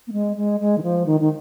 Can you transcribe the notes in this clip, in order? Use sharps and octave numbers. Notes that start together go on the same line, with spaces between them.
A#3
G#3
G#3
G#3
D#3
F3
D#3
D#3